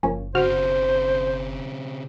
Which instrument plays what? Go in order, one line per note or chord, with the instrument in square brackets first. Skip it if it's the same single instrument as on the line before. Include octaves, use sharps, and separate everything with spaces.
[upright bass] F#1 [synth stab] F3 A#3 C#4
[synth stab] G1 F#4 F6 [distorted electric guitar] C#3 C4 [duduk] C5